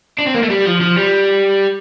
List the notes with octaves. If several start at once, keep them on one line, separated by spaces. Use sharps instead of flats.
D4
C4
A#3
A3
G3
F3
F3
G3